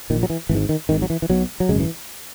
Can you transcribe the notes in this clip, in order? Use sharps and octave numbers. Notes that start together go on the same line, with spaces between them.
A#1 A#2 D#3
F#3
E3
G#1 E3
G#2
D#3
G#1 G#2 D#3
F#3
E3
E3
B1 B2 F#3
F#3
G#1 F#2 C#3 G#3
E3